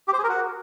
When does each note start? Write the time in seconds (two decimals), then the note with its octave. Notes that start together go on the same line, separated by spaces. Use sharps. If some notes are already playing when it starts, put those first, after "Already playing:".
0.08 G4
0.13 C5
0.18 G#4
0.24 A#4
0.29 F#4